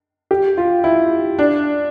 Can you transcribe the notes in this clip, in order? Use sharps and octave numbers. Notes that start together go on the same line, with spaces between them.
G4
F4
E4
D4